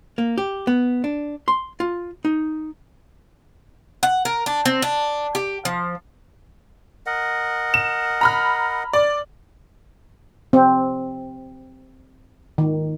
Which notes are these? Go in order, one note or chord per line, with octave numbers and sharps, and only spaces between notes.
A#3
G4
B3
D4
C6
F4
D#4
F#5
A#4
D4
C4
D4
G4
F3
A#4 D#5 F#5
E7
A#5 B5 F6
D5
C4
D#3